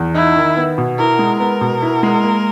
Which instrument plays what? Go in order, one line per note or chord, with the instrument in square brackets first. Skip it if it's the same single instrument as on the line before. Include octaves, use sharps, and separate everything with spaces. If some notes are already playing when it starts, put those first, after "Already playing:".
Already playing: [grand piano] E2
[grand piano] D#4 [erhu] E4
[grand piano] D#3
B3
B2
[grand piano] E4 [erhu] A#4
[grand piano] G#3
[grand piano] B3 [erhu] A#4
[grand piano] B2
E4
G#3
A#3